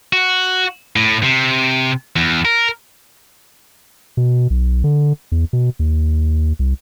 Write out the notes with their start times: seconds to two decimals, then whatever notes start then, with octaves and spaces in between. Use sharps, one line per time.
0.13 F#4
0.96 A2
1.23 C3
2.16 E2
2.45 A#4
4.17 B2
4.50 B1
4.84 D3
5.32 E2
5.53 B2
5.79 D#2
6.59 C2